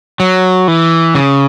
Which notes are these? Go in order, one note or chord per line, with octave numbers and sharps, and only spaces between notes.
F#3
E3
C#3